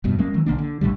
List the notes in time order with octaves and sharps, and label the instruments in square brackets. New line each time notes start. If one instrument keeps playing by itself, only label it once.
[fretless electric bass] F1 G2 B2
F#3 G#3 A#3 C#4
D#3 E3 F#3
B1 D3 A#3 D4
D3
B1 A2 D3 G3